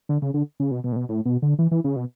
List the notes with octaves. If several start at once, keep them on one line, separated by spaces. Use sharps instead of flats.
D3
C#3
D3
C#3
B2
B2
A2
B2
A2
B2
D3
E3
E3
C#3
B2